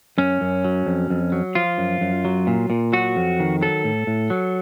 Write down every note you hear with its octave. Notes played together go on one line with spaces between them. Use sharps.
F#2 C#4
F#2
F#3
F2
F2
F#3
F3 F4
F#2
F#2
F#3
A#2
A#2
F#3 F#4
F2
D#3
F#3 A4
A2
A2
F#3